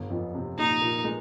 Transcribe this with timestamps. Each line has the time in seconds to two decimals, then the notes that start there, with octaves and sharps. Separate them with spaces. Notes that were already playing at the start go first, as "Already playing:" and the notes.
Already playing: G1
0.10 F2
0.35 C3
0.58 A#1 D#4
0.81 A#2
1.04 G#3